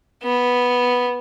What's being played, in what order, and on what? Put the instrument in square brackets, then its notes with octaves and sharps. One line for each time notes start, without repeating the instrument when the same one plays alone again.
[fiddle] B3